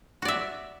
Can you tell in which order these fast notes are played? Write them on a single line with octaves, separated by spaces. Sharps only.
F#4 D5 E5